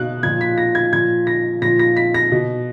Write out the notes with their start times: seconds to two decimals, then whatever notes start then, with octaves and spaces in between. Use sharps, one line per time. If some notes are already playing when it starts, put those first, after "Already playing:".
Already playing: B2 F#6
0.23 A#2 F3 G#6
0.41 B6
0.58 A#6
0.75 G#6
0.92 A#2 F3 G#6
1.27 A#6
1.62 A#2 F3 A#6
1.79 A#6
1.96 B6
2.14 A#6
2.32 B2